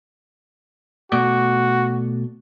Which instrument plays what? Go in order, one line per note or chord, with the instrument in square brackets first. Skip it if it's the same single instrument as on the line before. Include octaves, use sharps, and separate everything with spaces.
[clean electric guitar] B2 A3 D5 [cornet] F#4